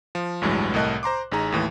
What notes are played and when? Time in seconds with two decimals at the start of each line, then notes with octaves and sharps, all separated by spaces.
0.15 F3
0.42 A1 D2 G2 E3 F#3 G#3
0.74 C2 A2 A#4 D#5 A5 F#6
1.03 C5 A#5 C6 D6
1.32 A1 D#4 G#4 A#5
1.52 D#2 A2 E3